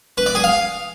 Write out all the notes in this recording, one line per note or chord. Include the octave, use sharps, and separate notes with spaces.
B4
D5
G#4
F5